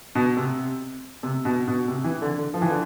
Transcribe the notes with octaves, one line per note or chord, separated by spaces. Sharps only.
B2
C3
C3
B2
B2
C3
E3
D3
D3
F3
E3
D3